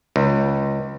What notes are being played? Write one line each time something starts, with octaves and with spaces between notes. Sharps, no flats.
C#2